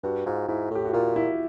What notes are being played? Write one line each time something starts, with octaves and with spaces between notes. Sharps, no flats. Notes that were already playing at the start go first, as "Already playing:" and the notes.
G2 F#4
G#2 F4
G#2 E4
A2 G4
F#4
A#2 F4
E4